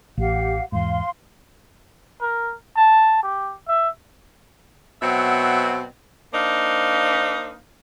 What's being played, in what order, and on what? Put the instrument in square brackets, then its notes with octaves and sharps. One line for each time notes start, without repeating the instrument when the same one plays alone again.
[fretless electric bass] A1 [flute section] G4 F5 F#5
[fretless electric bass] E2 G#2 [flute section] F5 C6
[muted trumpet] A#4
A5
G4
E5
[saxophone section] B2 F#3 C4 E5 F#5
A#3 D4 D#4 C5 F5